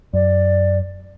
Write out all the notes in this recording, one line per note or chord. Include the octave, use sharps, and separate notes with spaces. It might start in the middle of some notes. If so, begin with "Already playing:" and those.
F#2 D5